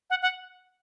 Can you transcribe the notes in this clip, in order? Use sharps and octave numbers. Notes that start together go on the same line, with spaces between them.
F#5
F#5